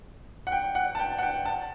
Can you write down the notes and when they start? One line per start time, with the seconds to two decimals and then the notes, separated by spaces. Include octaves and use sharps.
0.47 F#5
0.52 G5
0.75 F#5
0.95 A5
1.00 G5
1.19 F#5
1.23 G5
1.46 A5